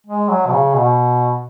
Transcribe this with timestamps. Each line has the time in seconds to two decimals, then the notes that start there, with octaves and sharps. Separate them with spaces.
0.06 G#3
0.29 F#3
0.46 B2
0.51 C#3
0.74 B2